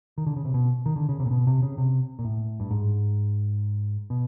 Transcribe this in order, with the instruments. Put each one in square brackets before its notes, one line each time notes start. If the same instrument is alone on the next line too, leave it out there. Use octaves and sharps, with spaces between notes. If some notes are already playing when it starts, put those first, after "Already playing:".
[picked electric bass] D#3
D3
C#3
C3
B2
D#3
D3
C#3
C3
A#2
B2
C3
C#3
C3
A#2
A2
G2
G#2
B2